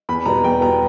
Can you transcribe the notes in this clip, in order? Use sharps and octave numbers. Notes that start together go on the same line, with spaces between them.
E2 B5
B2 G3 B3 A#5
E2 G5
B2 G3 B3 A#5